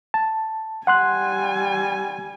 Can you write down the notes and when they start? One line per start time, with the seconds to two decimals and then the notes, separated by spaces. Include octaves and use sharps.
0.14 A5
0.87 G3 F#5 G#5 C6 F#6